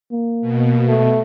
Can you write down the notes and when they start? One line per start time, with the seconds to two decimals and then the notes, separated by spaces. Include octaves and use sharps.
0.12 A#3
0.41 B2
0.88 A3